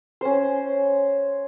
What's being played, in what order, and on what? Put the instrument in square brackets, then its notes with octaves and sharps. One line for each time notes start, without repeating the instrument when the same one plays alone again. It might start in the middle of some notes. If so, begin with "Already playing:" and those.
[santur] C#4 C5